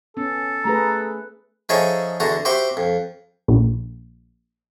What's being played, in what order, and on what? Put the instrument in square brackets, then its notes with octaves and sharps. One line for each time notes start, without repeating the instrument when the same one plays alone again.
[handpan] B3 C#4 [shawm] A4
[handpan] A3 G#4 B4 [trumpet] A#5
[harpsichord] F3 D#4 G#4 A4 C#5 E5
E2 D3 F#4 A5 A#5
F#4 G4 C5 E5 B5
F2
[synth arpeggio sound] A#1